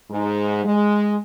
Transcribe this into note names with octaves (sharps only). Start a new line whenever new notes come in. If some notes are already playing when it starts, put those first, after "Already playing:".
G#2
G#3